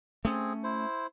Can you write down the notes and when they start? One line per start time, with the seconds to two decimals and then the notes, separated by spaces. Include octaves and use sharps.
0.25 A3 C4 C#4 G#4
0.64 E4 C5